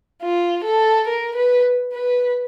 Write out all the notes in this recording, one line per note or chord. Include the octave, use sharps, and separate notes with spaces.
F4
A4
A#4
B4
B4